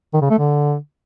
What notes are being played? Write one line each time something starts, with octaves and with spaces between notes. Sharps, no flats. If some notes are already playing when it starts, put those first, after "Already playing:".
D#3
C#3
A3
D3